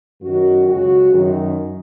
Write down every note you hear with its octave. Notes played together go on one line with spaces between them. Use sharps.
F#2 D#3 F#4
C#2 C#3 F#4
F#2 D#3